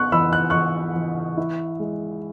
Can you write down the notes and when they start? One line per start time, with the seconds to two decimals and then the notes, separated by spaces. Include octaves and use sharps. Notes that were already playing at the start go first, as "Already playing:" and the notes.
Already playing: B3 C#6 F#6
0.12 E3 B5 E6
0.33 F#6
0.50 E3 C#6 F#6
0.95 E3
1.37 E4
1.80 G#3